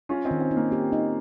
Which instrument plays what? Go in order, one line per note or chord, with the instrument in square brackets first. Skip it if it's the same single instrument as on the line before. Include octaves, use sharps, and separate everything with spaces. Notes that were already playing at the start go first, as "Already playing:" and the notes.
[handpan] G#3 [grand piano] C#4 F4
[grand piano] C4 D#4
[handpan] D#3
[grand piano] C4
[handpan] D#4
[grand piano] A#3
[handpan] G4
D#4